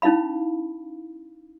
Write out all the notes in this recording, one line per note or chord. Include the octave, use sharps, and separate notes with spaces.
C#4 D#4 E4 F5 B5